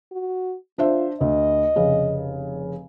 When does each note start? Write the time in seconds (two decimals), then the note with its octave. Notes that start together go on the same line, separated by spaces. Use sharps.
0.12 F#4
0.78 D4 F4 C5 E5
1.21 D2 D#5
1.76 F1 C#3